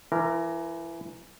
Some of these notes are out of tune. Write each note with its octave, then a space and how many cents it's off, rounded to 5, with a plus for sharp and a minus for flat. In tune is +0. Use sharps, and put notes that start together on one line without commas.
E3 +25 A#4 +0